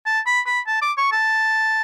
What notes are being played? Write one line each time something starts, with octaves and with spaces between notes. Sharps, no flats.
A5
B5
B5
A5
D6
C#6
A5